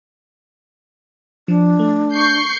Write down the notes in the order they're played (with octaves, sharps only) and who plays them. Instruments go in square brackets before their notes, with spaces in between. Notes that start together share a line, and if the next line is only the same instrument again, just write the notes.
[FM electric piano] F3 [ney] D4
[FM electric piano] A3
[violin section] C#6 G6 C7